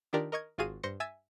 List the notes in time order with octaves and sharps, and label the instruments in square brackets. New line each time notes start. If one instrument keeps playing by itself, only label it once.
[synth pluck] D#3 D4 F4 G4 A#4 D5
A#4 D#5 C#6 G#6
G#1 F4 F#4 G#4 F5 D#7
G2 C5 C6 A#6 C#7
E5 G#5 E6 G#6 A6 E7